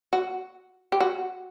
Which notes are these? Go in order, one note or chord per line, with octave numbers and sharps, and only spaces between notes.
F#4
G4
F#4